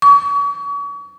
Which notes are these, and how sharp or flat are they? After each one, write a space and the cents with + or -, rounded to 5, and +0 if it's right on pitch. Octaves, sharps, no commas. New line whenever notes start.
C#6 +40